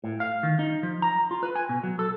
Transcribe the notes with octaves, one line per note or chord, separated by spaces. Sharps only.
A2
F5
D#3
D#4
F3
A#5
F4
B4
G#5
B2
F#3
A4